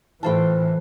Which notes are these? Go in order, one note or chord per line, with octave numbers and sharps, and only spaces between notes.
A2 E3 F4 C5 G5 A5